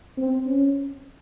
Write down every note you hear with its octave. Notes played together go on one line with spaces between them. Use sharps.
C4
C#4